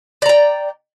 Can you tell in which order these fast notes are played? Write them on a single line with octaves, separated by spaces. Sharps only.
D5 A#5 G5